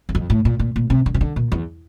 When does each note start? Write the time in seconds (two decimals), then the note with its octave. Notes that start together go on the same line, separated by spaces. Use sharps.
0.09 E2
0.15 F2
0.30 A2
0.45 A#2
0.60 A#2
0.76 A#2
0.90 C3
1.06 D3
1.14 C3
1.21 D3
1.36 A#2
1.52 E2